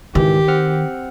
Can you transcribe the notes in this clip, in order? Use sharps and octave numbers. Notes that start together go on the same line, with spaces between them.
G#1 C#2 D#3 E3 G4
C4 F#5 F6